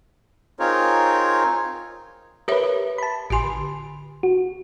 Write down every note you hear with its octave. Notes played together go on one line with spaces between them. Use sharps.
C4 D#4 F4 G#4 A#4 C#5
G4 A#4 B4 C#5 E5
G4
A5 B5
A1 G4 G#5 C6
D3
F#4